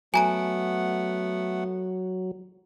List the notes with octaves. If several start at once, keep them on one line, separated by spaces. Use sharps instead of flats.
F#3 A3 B3 F#5 G#5 A#5 D7